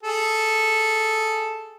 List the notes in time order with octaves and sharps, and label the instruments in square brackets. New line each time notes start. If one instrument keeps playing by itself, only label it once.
[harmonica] G#4 A4